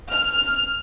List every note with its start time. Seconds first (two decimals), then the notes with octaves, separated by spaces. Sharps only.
0.12 F6